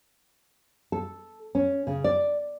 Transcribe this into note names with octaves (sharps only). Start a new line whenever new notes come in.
A4
C#4
C#3
D5